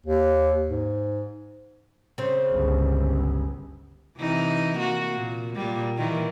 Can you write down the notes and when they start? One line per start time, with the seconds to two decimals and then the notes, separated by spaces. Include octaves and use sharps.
0.06 D#2
0.68 G#2
2.18 C#3 C4
2.52 G1 C#2
4.18 C3 E3 D#4
4.78 A#3 F#4
5.15 A#2
5.55 A#2 G3
5.97 A#2 D#3 E3